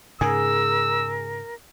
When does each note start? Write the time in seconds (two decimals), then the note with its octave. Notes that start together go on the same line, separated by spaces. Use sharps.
0.21 G#2 C#3 G#4 A#4 E6